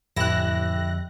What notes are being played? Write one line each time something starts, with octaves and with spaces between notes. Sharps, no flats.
A1 F2 D3 E4 G4 F#6 A#6